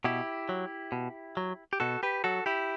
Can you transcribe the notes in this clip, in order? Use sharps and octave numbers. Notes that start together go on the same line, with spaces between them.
B2 E4 G4
F#3
B2
F#3
G4
B2 F#4 A4
G4 B4
F#3 F#4 A4
E4 G4